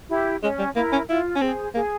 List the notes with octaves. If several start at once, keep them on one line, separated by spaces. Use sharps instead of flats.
E4 G4
G#3 C#4
G3
A#3 E4 A#4
C#4
E4 F4
C#4
C4 G#4 C5
A#3 G#4